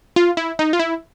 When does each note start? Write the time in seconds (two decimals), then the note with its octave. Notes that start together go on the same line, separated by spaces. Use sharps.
0.16 F4
0.37 E4
0.59 D#4
0.73 F4
0.79 E4